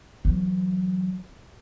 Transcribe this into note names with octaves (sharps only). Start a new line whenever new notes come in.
E3 F#3